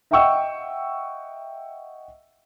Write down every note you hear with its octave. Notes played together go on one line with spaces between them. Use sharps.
D#5 E5 F#5 G5 C#6 E6